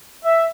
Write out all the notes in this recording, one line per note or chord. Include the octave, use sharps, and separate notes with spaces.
E5